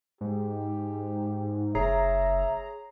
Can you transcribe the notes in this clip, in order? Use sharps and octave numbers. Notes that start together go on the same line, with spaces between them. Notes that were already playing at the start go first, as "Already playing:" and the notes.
G#2 G4
F#1 G#4 C#5 E5 A#5 C7